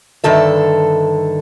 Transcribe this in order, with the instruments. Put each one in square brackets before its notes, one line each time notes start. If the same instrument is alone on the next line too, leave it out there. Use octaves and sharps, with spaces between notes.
[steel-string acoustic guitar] G2 D3 D#3 A4 E5